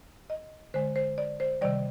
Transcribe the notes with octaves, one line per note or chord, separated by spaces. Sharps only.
D#5
D3 G#3 C5
C5
D5
C5
C3 D#3 G3 D5